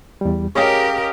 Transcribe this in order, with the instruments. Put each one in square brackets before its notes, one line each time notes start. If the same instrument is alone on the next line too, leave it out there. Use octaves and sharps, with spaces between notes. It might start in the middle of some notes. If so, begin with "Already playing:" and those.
[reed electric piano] E2 G3
[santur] C#4 D#5 F5 [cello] G4 A#4 [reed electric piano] G#4 G5